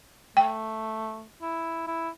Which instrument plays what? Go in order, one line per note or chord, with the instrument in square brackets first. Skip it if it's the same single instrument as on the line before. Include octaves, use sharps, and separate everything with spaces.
[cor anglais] A3 [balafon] G5
[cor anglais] E4
E4